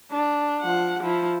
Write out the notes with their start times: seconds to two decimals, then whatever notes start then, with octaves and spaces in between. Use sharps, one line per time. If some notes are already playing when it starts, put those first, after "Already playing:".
0.11 D4
0.61 F3 F#5
1.04 F3 E4